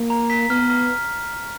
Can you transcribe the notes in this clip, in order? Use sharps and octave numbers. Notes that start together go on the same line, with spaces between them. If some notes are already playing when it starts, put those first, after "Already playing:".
Already playing: A#3
A#5
B6
B3 F6
F6